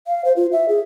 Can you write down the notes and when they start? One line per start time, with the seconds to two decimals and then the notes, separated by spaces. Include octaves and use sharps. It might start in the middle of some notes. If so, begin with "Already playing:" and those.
0.07 F5
0.25 C5
0.36 F4
0.52 E5
0.69 G#4